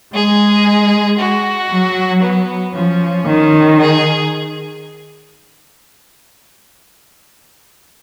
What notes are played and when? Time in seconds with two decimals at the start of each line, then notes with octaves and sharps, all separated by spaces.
0.15 G#3 G#4
1.19 F#4
1.70 F#3
2.23 B3
2.75 F3 C#4
3.26 D#3
3.79 G#4